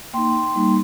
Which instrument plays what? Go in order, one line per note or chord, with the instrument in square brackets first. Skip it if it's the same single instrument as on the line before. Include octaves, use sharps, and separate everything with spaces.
[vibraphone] A#3 D#4 G5 C6
G3 A#3 D#4